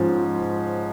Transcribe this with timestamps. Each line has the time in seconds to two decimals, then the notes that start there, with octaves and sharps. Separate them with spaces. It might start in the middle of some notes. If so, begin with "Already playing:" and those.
Already playing: G#2 F3 C#4